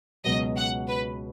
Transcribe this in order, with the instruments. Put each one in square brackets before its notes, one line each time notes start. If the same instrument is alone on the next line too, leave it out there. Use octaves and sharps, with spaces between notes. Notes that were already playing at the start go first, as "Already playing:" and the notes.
[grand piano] C#2 B2 F#3 [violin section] D#5
[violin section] F#5
B4